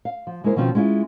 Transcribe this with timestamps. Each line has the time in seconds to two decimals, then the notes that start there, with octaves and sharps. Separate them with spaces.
0.05 F5
0.27 F3
0.44 D2 G#3 A#3 E4 A#4 C5
0.56 B2 D#3 F3 C4 C#4 F4
0.75 G#3 C#4 E4 F4